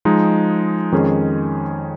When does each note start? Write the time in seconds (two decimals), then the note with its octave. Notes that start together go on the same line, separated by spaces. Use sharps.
0.05 F3 G#3 D#4 G#4
0.92 F2 D#3 G#3 C#4 G#4